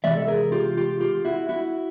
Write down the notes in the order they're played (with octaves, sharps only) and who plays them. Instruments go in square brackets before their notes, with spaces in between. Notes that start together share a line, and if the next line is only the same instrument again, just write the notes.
[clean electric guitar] C3 E3 G#3 D5 E5
A4
G#4 A#4
F4 G4
F4 G4
F4 G4
E4 F#4
E4 F#4